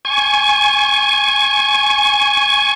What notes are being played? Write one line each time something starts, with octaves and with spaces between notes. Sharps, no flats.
G#5 C#6